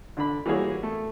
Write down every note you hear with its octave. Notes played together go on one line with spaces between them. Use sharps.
D3 D4 B5
E3 G3 A#3 F#4 G#4 C#5
A3